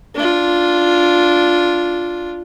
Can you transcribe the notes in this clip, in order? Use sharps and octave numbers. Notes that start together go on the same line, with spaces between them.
D4 F4